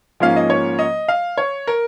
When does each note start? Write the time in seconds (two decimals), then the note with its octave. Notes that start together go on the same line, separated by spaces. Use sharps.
0.20 G#2 F3 A#3 C#4 F5
0.36 D#5
0.50 C#5
0.79 D#5
1.08 F5
1.38 C#5
1.67 A#4